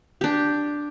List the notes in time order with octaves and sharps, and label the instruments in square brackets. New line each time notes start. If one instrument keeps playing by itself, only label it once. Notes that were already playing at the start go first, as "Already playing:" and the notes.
[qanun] D4 G4